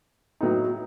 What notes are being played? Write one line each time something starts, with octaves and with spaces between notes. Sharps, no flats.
A2 F#3 B3 D#4